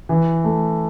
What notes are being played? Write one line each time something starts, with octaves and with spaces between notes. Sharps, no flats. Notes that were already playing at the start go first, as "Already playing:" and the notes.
E3
A3